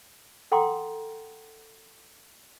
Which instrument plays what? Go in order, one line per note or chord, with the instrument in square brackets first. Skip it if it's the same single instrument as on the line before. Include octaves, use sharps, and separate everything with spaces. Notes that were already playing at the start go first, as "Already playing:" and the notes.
[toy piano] A4 F#5 G5 A#5 C6 D6